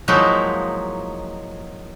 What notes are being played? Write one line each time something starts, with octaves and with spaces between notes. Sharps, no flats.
F3 F#3 G#3 A#3 D#4 E4